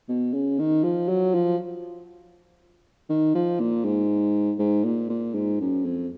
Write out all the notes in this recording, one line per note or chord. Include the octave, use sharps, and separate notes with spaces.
B2
C#3
D#3
F3
F#3
F3
D#3
F3
A#2
G#2
G#2
A#2
A#2
G#2
F#2
F2